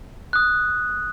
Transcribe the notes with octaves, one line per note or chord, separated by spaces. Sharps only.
D#6 F#6